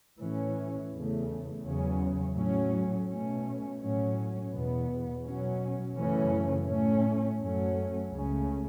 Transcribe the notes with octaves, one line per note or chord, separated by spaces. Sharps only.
A2 E3 C#4
E2 C#3 A3
E2 C#3 F#3 C#4
A2 F#3 C#4
B2 A3 C#4
A2 F#3 C#4
E2 B2 B3
B2 F#3 C#4
F#2 C#3 E3 A3 C#4
A2 A3 C#4
F#2 F#3 A3 C#4
C#2 C#3 A3 C#4